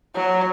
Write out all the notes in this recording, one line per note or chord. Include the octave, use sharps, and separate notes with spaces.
F#3